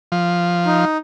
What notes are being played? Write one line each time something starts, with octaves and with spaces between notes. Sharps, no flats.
F3
D#4